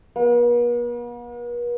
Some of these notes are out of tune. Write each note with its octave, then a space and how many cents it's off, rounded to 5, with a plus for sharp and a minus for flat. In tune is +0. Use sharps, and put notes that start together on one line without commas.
B3 -45